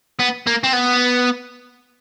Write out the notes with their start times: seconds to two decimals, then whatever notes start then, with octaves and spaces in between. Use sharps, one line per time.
0.19 B3
0.47 A#3
0.63 C4
0.73 B3